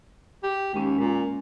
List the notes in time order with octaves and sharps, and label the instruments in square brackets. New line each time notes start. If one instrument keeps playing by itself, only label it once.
[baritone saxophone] G4
[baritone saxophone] D#2 [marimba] G#3 C#4
[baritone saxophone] A#2 [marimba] G#3